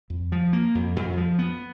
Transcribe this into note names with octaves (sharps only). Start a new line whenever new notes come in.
F2
F3
A#3
F2
F2
F3
B3